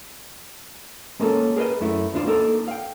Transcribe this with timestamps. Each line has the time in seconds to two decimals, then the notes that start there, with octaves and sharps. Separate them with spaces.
1.20 G#3 A#3 C#4 F4 A4
1.56 G#4 A#4 B4 D#5
1.81 F#2 A3 E4
2.13 D#2 D4 F4 C5
2.27 A#3 D#4 A4 A#4
2.68 F5 G5